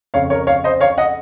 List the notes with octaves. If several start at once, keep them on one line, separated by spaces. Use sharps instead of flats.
F2 C#3 C#5 F5
A#4 C#5
C#5 F5
C5 D#5
C#5 F5
D#5 F#5